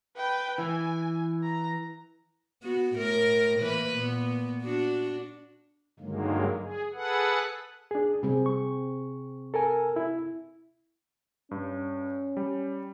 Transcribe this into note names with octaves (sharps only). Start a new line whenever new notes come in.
B4 G5
E3 G#5
A#5
B3 F#4
A2 A#4
E3 A#3 B4
A#2 B3
D4 F#4
G2 D3 D#3 F#3 G#3 A#3
G#4
G#4 A4 B4 F#5
D4 G#4
C3 G3 C4 G#4
C#6
A4 A#4 G#5
E4
G2 C#4
G3